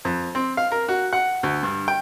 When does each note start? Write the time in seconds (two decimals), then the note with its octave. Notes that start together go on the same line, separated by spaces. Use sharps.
0.05 F2
0.35 C4
0.57 F5
0.72 A#4
0.88 F#4
1.13 F#5
1.43 D2
1.63 G2
1.88 G5